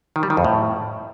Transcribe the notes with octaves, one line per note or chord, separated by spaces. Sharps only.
D#3
G3
D#3
F2
A2